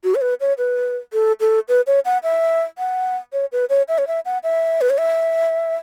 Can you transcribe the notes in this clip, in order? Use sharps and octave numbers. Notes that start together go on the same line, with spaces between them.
F#4
C#5
B4
C#5
B4
A4
A4
B4
C#5
F#5
E5
F#5
C#5
B4
C#5
E5
C#5
E5
F#5
E5
B4
C#5
E5